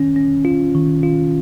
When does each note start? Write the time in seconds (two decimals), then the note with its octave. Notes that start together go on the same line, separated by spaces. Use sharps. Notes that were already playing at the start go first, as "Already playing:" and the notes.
Already playing: D#3 C#4
0.16 C#4
0.45 F4
0.75 D#3
1.03 F4